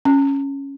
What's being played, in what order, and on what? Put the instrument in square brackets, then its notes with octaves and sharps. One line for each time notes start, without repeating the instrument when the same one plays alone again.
[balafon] C#4